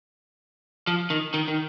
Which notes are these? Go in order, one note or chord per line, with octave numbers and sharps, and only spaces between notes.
F3
D#3
D#3
D#3